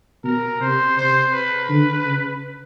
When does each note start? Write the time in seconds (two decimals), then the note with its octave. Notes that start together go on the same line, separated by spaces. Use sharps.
0.24 B2 A#4
0.61 C3 C5
0.97 C3 C5
1.33 B4
1.69 D3
2.06 C#3